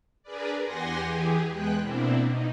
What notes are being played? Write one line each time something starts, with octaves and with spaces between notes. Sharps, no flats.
D4 G#4 A#4 B4 D5
E2 G4 F#5 G#5 C6 A#6
E3 G4 G#4
E2 G#3 B3 G5 F#6
B2 A#3 C4 D4 E4
B2 D#4